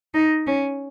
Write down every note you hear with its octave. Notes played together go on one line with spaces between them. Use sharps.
D#4
C#4